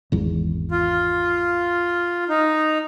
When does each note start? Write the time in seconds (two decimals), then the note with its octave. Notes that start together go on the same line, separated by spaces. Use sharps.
0.12 G#1 E2
0.71 F4
2.29 D#4